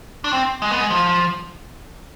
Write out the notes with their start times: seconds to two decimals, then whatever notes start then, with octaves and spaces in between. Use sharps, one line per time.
0.24 D4
0.33 C4
0.62 G#3
0.71 B3
0.81 G#3
0.90 F3